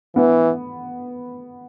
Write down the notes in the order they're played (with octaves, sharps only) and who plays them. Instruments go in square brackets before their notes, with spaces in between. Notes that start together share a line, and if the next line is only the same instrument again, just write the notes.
[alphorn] E3 [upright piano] B3